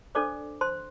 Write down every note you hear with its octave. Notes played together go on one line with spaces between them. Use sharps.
D4 A4 C5 D5 D6
C5 C6